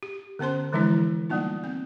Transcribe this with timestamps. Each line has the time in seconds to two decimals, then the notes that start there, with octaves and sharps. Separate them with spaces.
0.03 G4
0.39 D3 B3 C#4 C5 C6
0.72 D3 E3 F3 G#3 D4 E4
1.29 G3 A#3 B3 D#4 F4
1.64 C4